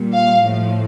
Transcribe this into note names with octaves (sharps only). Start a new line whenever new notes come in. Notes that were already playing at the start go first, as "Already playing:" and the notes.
Already playing: A#2 G3
F5
A2 F3